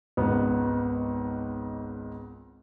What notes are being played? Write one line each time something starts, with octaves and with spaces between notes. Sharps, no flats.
G#1 C#2 B3